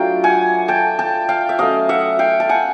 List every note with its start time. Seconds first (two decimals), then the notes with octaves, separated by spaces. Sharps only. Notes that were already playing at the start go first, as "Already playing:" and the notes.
Already playing: F#3 A3 D4 F4 F5 G5
0.24 F#5 G#5
0.68 G5 A5
0.99 G5 A5
1.29 F5 G5
1.49 E5
1.59 F#3 A3 C#4 D#5 F5
1.89 E5 F#5
2.19 F5 G5
2.40 A5
2.49 F#5 G#5